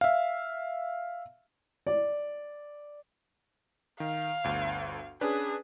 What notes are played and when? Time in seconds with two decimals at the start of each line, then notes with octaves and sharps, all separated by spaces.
0.01 E5 F5
1.87 D5
4.00 D#3 F5
4.44 G1 D2
5.21 C#4 D4 G#4 B4